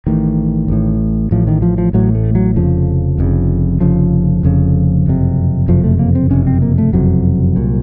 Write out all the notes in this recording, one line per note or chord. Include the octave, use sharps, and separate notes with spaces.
A1 A2 D#3
A1 A2
A1 A2 F3
D#3
F3
F3
A1 A2 F#3
A3
F#3
F1 F2 C#3 F3
F1 F2 C#3
F1 F2 C#3 F3
F1 F2 C#3
F#1 F2 C3
F#1 F2 C3 F3
A3
A#3
C4
F#1 F2 C3 C#4
C4
A#3
A3
F#1 F2 C3 F#3
C2 A#2